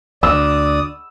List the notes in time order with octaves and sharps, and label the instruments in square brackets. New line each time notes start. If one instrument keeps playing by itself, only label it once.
[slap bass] D2 [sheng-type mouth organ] D5 D#6 [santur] E6